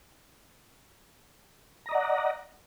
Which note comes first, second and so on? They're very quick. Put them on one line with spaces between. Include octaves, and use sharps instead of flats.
A#5 D#5 D5 F#5